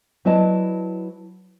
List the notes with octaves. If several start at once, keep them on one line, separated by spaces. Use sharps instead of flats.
F#3 E4 B4 D5 D#5 A5